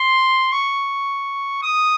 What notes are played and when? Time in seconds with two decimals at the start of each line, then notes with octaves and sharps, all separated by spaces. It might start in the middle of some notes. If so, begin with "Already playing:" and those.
Already playing: C6
0.52 C#6
1.62 D#6